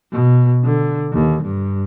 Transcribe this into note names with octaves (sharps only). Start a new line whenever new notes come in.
B2
D3
D#2
G2